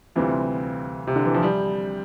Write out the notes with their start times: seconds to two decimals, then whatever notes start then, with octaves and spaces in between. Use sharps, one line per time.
0.16 D2 C3 E3 G3 C4 F4
1.07 C3
1.16 D3
1.26 E3
1.34 F3
1.43 G3